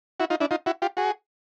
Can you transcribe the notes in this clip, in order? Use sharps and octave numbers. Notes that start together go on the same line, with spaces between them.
E4 F#4
D#4 F4
D4 E4
D#4 F4
E4 F#4
F4 G4
F#4 G#4